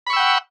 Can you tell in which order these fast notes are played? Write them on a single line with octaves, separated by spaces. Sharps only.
B5 C#6 E6 G5 F#5